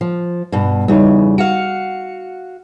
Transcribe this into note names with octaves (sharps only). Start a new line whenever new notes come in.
F3
G2 B2
E2 C#3 G3 D#4
F#4 F5 C#7